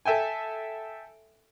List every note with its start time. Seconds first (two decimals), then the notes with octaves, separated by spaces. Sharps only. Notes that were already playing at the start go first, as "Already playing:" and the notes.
0.05 A4 E5 G5 G#5